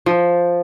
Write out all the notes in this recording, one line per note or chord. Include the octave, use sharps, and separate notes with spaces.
F3